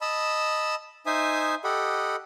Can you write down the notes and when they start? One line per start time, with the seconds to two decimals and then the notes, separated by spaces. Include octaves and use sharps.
0.01 D#5 A5 B5 E6
1.06 D#4 C5 E5 G#5 D#6
1.64 G4 A4 D#5 F#5 B5